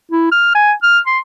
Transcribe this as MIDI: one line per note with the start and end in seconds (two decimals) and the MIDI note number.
0.11 0.31 64
0.32 0.55 89
0.55 0.72 80
0.83 0.99 89
1.07 1.19 84